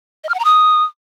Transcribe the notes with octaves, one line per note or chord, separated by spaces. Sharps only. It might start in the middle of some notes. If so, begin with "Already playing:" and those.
D#5
F6
F#5
A#5
D#6